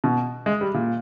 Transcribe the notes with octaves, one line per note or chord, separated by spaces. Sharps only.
B2
G#3
G3
A#2